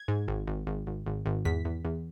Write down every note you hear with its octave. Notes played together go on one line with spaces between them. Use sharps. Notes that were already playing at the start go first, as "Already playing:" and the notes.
Already playing: G#6
G#2
G#1
G#1
G#1
G#1
G#1
G#1
E2 B6
E2
E2